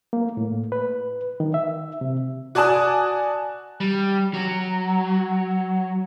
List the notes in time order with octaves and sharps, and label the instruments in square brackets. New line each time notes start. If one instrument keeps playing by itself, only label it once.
[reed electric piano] A#3
A2
B4
D#3
E5
C3
[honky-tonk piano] F#4 D5 G#5 A5 D#6 F#6
[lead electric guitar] G3
F#3